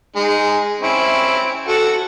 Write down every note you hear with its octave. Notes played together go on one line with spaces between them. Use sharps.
G#3 D#4
C4 C#4 E4
F#4 A4